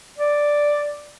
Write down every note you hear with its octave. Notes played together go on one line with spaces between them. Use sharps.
D5